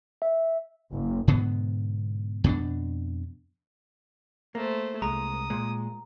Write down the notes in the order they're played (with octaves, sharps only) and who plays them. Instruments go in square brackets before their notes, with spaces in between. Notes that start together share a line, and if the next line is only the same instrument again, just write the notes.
[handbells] E5
[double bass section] F#1
[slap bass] G#2 B2 D3 B3
F2 B2 B3 D4
[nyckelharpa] A3 C5 [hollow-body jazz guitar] A#3
[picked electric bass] C2 G#3 [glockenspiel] A#5 [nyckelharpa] D#6
[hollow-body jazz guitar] A#2 [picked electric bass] G#3